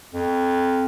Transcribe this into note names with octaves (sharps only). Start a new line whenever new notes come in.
F2